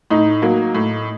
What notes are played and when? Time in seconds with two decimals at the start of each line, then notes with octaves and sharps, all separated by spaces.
0.10 A2 D#4
0.42 F#3 A#3
0.74 A2